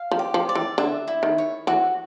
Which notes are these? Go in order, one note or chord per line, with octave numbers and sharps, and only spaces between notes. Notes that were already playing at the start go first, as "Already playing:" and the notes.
Already playing: F5
F3
G4
F3
D5
E3
D3 E5
E4
D#3
C#5
E3 F#4